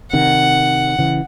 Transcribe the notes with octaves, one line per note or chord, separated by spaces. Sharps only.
C3 D#3 F#5
C#3 E3